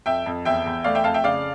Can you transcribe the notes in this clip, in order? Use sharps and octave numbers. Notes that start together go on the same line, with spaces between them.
F2 E5 G5
F2
E2 E5 G5
E2
A3 D5 F5
E5 G5
F2 F5 A5
E5 G5
C#3 D5 F5